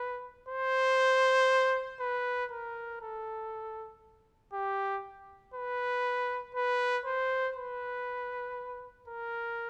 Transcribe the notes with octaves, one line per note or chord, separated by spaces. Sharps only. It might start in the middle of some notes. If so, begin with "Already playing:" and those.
Already playing: B4
C5
B4
A#4
A4
G4
B4
B4
C5
B4
A#4